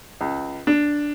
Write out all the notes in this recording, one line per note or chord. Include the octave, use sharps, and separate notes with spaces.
C#2
D4